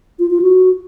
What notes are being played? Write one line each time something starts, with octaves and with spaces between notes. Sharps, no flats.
F4
F4
F#4